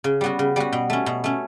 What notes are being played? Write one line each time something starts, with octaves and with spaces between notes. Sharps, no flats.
C#3
G3 B3 F#4
C#3
G3 B3 F#4
B2
A3 C#4
B2
A3 C#4